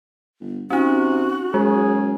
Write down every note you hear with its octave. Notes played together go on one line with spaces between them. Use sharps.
G1
C3 C#4 D#4 F#4
F#2 G#3 G#4